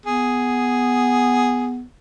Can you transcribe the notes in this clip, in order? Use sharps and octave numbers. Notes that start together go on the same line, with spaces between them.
B3 G#4